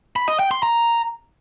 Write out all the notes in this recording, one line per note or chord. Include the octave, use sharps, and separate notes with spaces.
B5
D#5
G5
C6
A#5